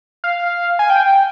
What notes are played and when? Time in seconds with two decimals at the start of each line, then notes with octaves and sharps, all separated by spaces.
0.24 F5
0.79 G#5
0.90 G5